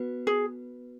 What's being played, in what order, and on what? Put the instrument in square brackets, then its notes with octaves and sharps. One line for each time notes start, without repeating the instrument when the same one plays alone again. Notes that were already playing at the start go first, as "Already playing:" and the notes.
Already playing: [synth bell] B3 F#4 B4
[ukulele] G#4